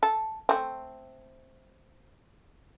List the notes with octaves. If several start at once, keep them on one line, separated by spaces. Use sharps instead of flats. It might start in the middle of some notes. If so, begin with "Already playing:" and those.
A4
A3 C4